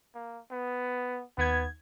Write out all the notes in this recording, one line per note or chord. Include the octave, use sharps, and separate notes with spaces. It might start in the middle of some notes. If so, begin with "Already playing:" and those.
A#3
B3
D#2 B3 G#6